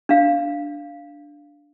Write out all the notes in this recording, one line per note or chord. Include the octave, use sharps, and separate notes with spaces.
D4 F5